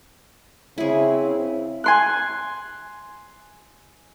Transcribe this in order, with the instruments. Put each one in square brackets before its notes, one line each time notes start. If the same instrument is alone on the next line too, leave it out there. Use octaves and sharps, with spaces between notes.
[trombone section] C#3 C4 [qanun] E4 G#4
[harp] G#5 C6 F#6